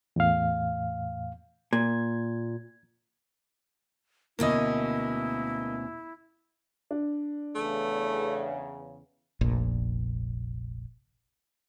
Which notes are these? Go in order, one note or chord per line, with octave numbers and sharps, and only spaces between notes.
E2 A2 F5
A#2 G#6
D2 B2 A#3 C#4 E4 D#5
D4
E2 C#3 A3
F1 A#1 A#2